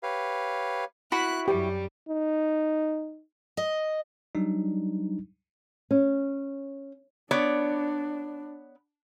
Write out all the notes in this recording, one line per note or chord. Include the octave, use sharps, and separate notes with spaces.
G4 B4 C#5 F5
E4 F#4 B5 F#6
F#2 G3 G4
D#4
D#5
F#3 G3 D4 D#4
C#4
B3 D4 C#5 D5